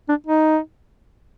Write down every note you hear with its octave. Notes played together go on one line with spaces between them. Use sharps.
D4
D#4